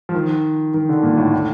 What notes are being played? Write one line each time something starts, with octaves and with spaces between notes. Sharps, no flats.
F3
D#3
D#3
D3
A#2
A2
A2